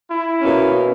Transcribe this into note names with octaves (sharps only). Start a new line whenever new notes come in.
E4
B2 A#3 C#4